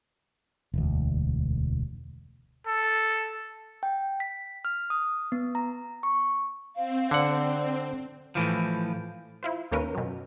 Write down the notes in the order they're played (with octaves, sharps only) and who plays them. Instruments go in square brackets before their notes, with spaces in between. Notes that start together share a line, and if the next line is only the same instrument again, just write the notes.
[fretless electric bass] E1 D2
[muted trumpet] A4
[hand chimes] G5
B6
F6
D#6
B3
A#5
C#6
[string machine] C4 [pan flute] F5
[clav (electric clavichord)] D3 F#5 [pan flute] D5
[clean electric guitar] A2 E3 F3
[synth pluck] E4 F4 C5
D#2 A#3 C#4 A#4 B4 D#7
F#2 B2